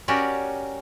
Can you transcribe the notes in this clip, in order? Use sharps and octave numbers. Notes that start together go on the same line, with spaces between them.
C#4 F#4 G4 A#4 D5